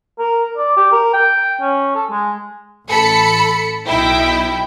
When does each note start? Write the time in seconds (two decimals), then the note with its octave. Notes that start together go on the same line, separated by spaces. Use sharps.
0.19 A#4
0.57 D5
0.77 G4
0.92 A#4
1.13 G5
1.61 C#4
1.95 A4
2.10 G#3
2.88 A1 A4 B5 C#7
3.88 B1 D#4 E4 G5